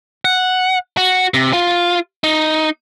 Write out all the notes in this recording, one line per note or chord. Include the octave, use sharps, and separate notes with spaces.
F#5
F#4
C3
F4
D#4